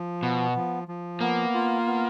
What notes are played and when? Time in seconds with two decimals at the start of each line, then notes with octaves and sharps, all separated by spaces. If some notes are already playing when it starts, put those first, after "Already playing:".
Already playing: F3
0.23 B2 B3
0.56 F3
0.88 F3
1.21 A#3 B3
1.54 F4
1.87 B3